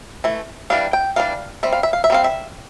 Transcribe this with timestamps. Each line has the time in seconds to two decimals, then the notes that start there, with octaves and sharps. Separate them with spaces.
0.24 E3 A3
0.70 E3 G3 D4 F5
0.93 G5
1.16 E3 G3 D4 F5
1.63 G3 C4 E5
1.72 F5
1.83 E5
1.93 F5
2.04 E5
2.10 G3 C4 F5
2.24 E5